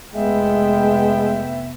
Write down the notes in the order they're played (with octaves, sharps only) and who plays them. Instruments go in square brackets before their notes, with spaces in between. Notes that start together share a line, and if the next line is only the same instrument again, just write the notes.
[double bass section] F1 A3 B3 [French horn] G#3 [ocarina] E5 [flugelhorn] G5